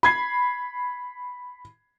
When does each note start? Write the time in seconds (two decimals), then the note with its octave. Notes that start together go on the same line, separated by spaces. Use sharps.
0.03 B5 G#6 C7